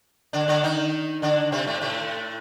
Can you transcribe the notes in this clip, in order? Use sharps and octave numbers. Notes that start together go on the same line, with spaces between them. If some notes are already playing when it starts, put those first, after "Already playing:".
D3 D4
D3 D4
D#3 D#4
D3 D4
C3 C4
A2 A3
A2 A3